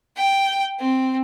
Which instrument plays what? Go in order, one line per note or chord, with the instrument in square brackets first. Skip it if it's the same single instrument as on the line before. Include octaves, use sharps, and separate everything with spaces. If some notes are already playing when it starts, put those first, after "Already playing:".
[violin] G5
C4